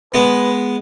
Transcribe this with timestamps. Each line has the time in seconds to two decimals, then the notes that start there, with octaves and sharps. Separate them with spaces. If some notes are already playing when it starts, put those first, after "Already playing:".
0.14 G#3 B3 B4